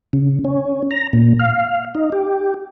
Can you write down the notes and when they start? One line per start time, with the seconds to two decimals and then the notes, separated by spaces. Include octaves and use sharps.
0.13 C#3
0.45 C#4
0.91 A#5
1.13 A#2
1.39 F5
1.95 D#4
2.12 G4